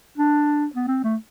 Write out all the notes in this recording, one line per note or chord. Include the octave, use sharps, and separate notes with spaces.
D4
B3
C4
A3